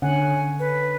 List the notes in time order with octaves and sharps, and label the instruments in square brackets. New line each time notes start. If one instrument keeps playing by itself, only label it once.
[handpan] D3 C#4 F#5 [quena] G#5
[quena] B4